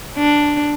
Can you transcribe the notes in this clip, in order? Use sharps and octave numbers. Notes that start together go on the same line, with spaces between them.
D4